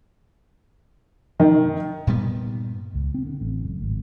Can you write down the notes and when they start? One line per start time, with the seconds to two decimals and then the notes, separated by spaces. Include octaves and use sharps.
1.40 D#3
2.07 G2 A#2 G3 B3
2.94 C#2
3.14 C4
3.27 D3
3.41 A1
3.63 F#1
3.82 G#1